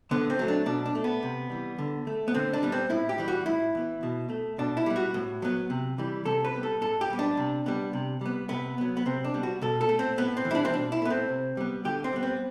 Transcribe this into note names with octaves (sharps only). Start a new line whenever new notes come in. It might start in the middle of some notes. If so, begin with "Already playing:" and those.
D3 B3
C4
F#3 A3
D4
B2 D4
D4
A3
B3
C3
E3 G3
D3
A3
B3
D3 C4
D4
G3 B3
C4
A2 E4
G4
E3 G3
F#4
A2 E4
E3 B3
B2
A3
B2 D4
E4
G3 B3
F#4
A2
F#3 B3
C3
E3 G3
C3 A4
B4
G3 B3
A4
A2 A4
G4
G3 B3
D4
C3
G3 B3
C3
G3 B3
C3 B3
F#3 B3
B3
C3 C4
D4
G3 B3
F#4
B2 A4
A4
A3
C4
A2 B3
C4
E3
G3 D4 E4
C4
B2 D4
E4
A3 B3
C4
C3
G3 B3
D3 G4
C4
G3 B3
C4